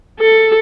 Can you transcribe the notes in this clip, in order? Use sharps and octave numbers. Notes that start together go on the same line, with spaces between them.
A4